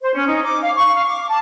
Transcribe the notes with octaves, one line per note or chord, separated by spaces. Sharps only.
C5
C#4
D#4
D6
F5
C#6
F5
D6
A5